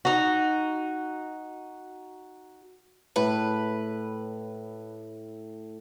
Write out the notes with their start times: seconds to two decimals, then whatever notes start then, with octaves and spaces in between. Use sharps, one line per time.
0.05 D#4 F#4
3.16 A2 B4